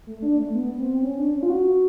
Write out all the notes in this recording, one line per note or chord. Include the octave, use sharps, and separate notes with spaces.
A3
D4
A3
B3
C4
C#4
D4
C#4
F4
F#4